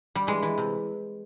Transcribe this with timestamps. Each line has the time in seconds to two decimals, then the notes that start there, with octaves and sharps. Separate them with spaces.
0.15 G3
0.27 E3 G#3
0.43 E3
0.58 C3